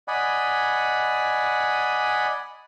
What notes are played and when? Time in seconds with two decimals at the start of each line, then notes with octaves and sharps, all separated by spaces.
0.08 D5 D#5 F#5 G#5 B5